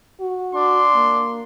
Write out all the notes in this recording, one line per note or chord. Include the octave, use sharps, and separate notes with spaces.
F#4
D4 C6
A#3